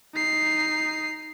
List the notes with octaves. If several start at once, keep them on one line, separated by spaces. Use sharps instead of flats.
D#4 C7